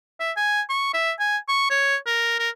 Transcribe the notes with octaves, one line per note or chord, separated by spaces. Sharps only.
E5
G#5
C#6
E5
G#5
C#6
C#5
A#4
A#4